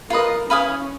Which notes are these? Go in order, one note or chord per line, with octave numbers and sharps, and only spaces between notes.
F4 A#4 B4 D#5
C#4 B4 F5 G#5 D#6